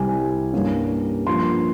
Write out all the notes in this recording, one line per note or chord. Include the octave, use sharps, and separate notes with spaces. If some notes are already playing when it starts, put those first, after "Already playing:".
Already playing: C2 C3 G3 G#5
G2 G3 A#3 C#4
G2 F3 A#3 C6